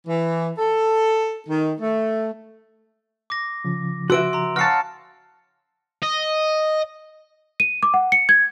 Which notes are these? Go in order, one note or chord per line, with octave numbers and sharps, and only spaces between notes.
E3
A4
D#3
A3
D6 A#6
C#3 F3
F#4 B4 E5 C6 E6 D7
A#5 C6
F#4 F5 A5 F6 C#7
D#5
D#7
D6
F#5
C#7
G#6